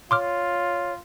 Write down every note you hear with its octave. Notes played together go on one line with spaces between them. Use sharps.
F4 C#5 C6 D6 F6